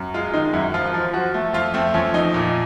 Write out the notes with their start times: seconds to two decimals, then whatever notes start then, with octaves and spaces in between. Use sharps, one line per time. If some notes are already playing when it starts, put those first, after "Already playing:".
Already playing: F#2
0.14 G#3 F4
0.34 D#3 D#4
0.53 F#2 E4
0.74 F3 F4
0.94 F3
1.13 F3 F#4
1.34 A3
1.54 F2 F4
1.74 A3 C4
1.94 F2 C#4
2.14 F2 D#4
2.34 A#2